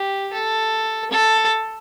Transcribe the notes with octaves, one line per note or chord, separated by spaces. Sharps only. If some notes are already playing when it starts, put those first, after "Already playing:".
Already playing: G4
A4
A4